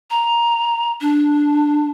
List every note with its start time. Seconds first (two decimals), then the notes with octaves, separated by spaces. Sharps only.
0.11 A#5
1.01 D4